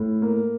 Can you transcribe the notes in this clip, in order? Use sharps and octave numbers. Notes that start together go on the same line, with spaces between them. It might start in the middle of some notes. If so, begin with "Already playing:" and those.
Already playing: A2
A#3